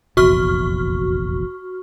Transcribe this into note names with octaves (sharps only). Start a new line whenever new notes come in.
F1 A#1 E2 F#4 C#6 F6